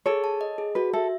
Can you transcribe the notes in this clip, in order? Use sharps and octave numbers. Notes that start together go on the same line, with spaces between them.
G#4 A4 C#5
A5
D#5
G#4
F#4 B4
A4 E5